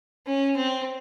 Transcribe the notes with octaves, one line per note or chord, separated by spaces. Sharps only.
C#4
C4